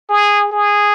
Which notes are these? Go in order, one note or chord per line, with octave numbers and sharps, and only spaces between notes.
G#4
G#4